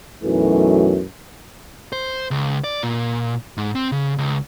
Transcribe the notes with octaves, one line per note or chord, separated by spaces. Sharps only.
B1 F#2 E3 A3
C5
C#2
D5
A#2
G#2
C4
C#3
C#2